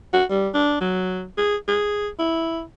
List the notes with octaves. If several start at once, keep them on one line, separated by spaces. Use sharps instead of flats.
F#4
G3
D4
F#3
G#4
G#4
E4